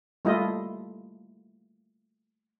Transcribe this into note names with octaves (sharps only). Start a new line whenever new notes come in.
G3 A3 A#3 E4 F4 D#5